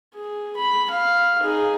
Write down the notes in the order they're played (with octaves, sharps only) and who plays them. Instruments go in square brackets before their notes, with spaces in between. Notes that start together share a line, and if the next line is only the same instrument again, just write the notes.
[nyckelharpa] G#4
B5
F5
D#4 G#4